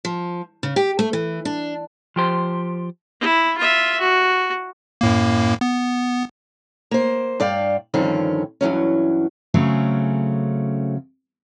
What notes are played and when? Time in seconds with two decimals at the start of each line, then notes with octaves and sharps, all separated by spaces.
0.05 F3
0.63 C#3
0.76 G4
0.99 A3
1.13 E3
1.45 D4
2.16 F3 G4 C5
3.20 E4
3.57 F4 E5
3.99 F#4
5.01 F#2 A2 A#3
5.61 B3
6.91 A#3 C5
7.40 G2 D5 F5 G5
7.94 G2 D3 D#3 F3 C4 C#4
8.61 G2 E3 F#3 C#4
9.54 C#3 F#3 A3 C4 C#4